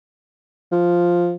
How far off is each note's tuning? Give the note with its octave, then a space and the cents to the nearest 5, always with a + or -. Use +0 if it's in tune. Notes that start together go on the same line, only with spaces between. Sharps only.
F3 +0